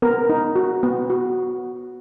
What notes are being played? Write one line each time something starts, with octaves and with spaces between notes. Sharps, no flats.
B3 A#4
D#4
F#4
B3
F#4